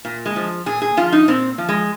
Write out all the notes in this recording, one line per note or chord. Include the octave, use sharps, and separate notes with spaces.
A#2
G#3
F3
A#2 G#4
G#4
F3 F4
D#4
A#2 C4
F3
G#3